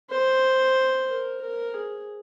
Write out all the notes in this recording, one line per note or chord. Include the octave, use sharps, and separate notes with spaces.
C5
A#4
A#4
G#4